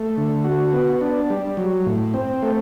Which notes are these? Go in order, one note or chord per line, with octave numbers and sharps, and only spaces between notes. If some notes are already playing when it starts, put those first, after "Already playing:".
Already playing: A3
D3
F#4
B3
D4
G3
F#3
A2
C4
A3